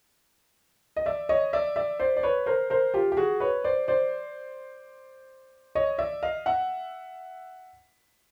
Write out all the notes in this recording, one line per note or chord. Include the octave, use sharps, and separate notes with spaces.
D#5
D5 E5
C#5 D#5
D5 E5
D5 E5
C5 D5
D5
B4 C#5
A#4 C5
A#4 C5
F4 G4
G4
F#4 G#4
B4 C#5
C5 D5
C5 D5
C#5 D#5
D5 E5
D#5 F5
E5 F#5